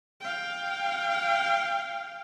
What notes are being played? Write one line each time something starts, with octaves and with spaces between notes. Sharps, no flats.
F5 G5